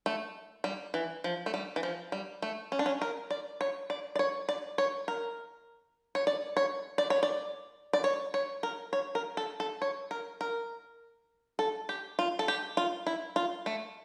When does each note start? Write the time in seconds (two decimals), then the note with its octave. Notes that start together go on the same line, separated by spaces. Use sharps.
0.06 A3
0.64 G3
0.94 E3
1.24 F3
1.46 A3
1.54 G3
1.76 E3
1.83 F3
2.12 G3
2.42 A3
2.72 C#4
2.79 D4
2.86 C#4
3.02 A#4
3.31 D5
3.61 C#5
3.90 D5
4.16 D5
4.19 C#5
4.49 D5
4.78 C#5
5.08 A#4
6.15 C#5
6.27 D5
6.57 C#5
6.98 D5
7.10 C#5
7.23 D5
7.93 D5
8.04 C#5
8.34 C#5
8.63 A#4
8.93 C#5
9.15 A#4
9.37 A4
9.60 A4
9.82 C#5
10.11 A#4
10.41 A#4
11.59 A4
11.89 G4
12.19 F4
12.39 A4
12.48 G4
12.77 F4
13.07 E4
13.36 F4
13.66 A3